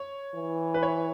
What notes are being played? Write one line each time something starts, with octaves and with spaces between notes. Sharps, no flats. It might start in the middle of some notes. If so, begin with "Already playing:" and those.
Already playing: C#5
E3
B4
C#5